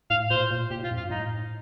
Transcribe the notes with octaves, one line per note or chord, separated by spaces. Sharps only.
A2 F5
A#2 C5
A#2
A#2 G4
A2 F4
F2
F4
G2
A2 D#4